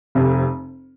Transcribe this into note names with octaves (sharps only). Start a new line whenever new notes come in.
F1 F2 C3